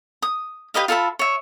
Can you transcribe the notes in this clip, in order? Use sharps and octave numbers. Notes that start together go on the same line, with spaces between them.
D#6
G4 B4 D#5 F5
F4 A4 E5 B5
C#5 E5